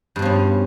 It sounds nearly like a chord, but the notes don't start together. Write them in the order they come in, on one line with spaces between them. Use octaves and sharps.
G2 B2 F3 C#4